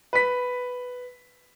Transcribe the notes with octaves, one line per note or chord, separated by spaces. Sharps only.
B4 B6